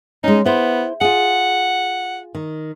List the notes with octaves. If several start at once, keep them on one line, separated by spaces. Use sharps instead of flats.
G#3 C#4 D#4
B3 E4 C5
F4 G#4 F#5
D#3